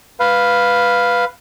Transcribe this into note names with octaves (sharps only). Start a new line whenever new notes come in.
B4 F5